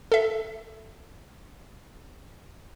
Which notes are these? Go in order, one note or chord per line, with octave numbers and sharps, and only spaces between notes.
A4 E5